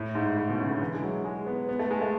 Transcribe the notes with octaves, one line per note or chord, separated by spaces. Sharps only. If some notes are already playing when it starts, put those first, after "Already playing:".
Already playing: A2
G#2
A2
B2
C#3
D3
E3
G#3
F#3
G#3
B3
B3
A3
G#3
A3